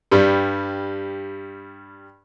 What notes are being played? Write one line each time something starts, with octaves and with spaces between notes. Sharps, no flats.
G2 G3